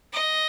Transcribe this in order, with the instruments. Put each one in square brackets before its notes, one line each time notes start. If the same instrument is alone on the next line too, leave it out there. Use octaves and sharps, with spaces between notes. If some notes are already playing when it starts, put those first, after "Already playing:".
[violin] D#5